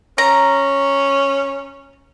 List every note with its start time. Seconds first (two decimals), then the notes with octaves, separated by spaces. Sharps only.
0.18 C#4 A#5